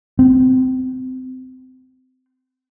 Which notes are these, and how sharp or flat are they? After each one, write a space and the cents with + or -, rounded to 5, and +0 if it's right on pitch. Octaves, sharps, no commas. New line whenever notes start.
C4 -25